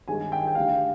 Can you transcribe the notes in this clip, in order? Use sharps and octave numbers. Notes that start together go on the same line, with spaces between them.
G2 D#3 G#3 G#5
G5
G5
D2 D3 G3 F5